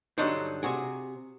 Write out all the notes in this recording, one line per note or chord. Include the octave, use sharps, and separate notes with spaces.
G2 D3 F#3 D4 D#4 C5
C3 F#4 G#4